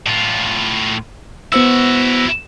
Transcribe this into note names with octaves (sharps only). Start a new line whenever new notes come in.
A2 F4
B3 E4 F#4 C5 E6